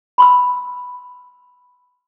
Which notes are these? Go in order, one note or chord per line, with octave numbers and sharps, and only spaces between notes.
B5 C6 E6